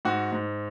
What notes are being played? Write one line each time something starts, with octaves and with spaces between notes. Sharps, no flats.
G#2 F#4
G#2